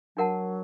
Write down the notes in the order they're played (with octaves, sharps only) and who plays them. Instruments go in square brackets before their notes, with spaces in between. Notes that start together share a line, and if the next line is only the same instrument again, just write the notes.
[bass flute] F#3 [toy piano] D4 F#4 A#4 F#5 A5